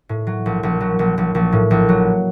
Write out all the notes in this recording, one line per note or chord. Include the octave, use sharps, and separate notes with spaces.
A2
F#3
A#1
A#1
F#3
A#1
A#1
A#1
A2
A#1
F#3